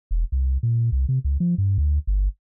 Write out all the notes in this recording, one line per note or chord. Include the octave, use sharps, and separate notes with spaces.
E1
C2
A#2
C2
C3
C#2
F3
G2
D2
G1